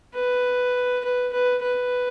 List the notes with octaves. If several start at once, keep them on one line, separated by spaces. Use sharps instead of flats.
B4
B4
B4
B4